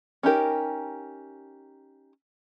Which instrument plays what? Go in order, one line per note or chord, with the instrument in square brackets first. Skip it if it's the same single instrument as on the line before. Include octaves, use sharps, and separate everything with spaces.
[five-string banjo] C#4 D#4 G4 A#4